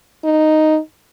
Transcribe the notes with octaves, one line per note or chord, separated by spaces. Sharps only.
D#4